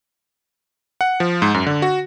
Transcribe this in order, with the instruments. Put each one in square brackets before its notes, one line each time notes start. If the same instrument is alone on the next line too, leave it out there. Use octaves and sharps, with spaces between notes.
[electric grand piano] F#5
F3
G#2
F#2
D3
F#4